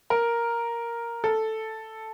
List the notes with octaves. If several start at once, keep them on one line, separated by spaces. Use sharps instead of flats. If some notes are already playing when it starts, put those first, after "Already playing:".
A#4
A4